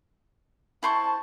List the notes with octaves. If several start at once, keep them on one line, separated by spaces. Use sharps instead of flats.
E4 C5 A5 C#6